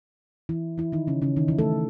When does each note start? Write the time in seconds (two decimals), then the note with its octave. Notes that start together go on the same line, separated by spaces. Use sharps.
0.49 E3 E4
0.78 E3 E4
0.92 D#3 D#4
1.07 C#3 C#4
1.22 C#3 C#4
1.36 D#3 D#4
1.48 E3 E4
1.58 A3 A4